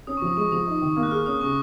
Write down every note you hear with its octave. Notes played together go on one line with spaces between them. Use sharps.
C#4 D#6
C#6
F3 D#6
G#3 C#6
F3 D#6
D#4
D#3
A#3
F#6
G#4 F6
C#4 D#6
C#3 C#6